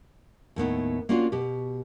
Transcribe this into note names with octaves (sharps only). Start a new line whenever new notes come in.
D#2 A2 B3 D#4
A#3 B3 C#4 D4 F4 F#4
B2 G4